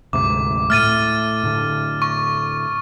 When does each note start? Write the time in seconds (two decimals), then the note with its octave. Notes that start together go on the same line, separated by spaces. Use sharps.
0.13 D2 G#2 C3 D6
0.70 A2 A3 F6 A6 D#7
1.44 A2 D3
2.02 C#6